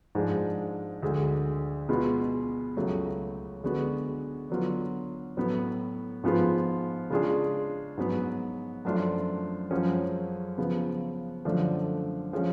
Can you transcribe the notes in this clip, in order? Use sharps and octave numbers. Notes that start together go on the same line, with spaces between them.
G#2 F3 G#3 D4
D2 D3 G#3
B2 G#3 B3 F4
C#2 C#3 F#3 A3
D3 G#3 B3 F#4
D3 F#3 B3 F4
A2 F#3 B3
G#2 F3 B3 F4 G#4
C#3 G#3 D4 F4 G#4
G#2 F#3 B3
F#2 F3 A3 D4 F4
F#2 F3 G#3 C#4 G#4
C#3 F3 B3
F#2 D3 F3 A3 D4
F3 G#3 C#4